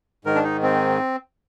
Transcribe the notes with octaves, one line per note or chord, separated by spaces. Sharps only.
G#2 D#3 A#4
D4
D#4
C4